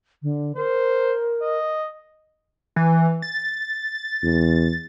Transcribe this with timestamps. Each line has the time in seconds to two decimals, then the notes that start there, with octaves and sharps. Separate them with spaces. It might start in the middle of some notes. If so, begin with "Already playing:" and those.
0.22 D3
0.56 A#4 C5
1.42 D#5
2.76 E3
3.22 A6
4.24 E2